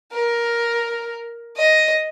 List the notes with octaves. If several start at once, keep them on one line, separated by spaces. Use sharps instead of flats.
A#4
D#5